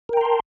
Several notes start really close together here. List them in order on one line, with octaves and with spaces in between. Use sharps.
A#4 G5 A#5 C6 A5